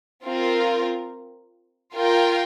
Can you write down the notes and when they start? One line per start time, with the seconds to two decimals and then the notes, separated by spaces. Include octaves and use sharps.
0.24 C4 F4 A#4
1.94 F4 A#4 G5